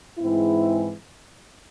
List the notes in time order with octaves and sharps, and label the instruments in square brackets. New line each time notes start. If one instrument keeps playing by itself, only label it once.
[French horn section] G#2 E3 G#3 C4 E4